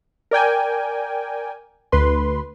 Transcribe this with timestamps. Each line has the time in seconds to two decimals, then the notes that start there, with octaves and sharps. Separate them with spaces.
0.31 A#4 D5 G5 G#5
1.92 D2 B4 C6